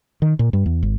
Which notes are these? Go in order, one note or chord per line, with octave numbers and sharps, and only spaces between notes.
D#3
A#2
G2
E2
G#1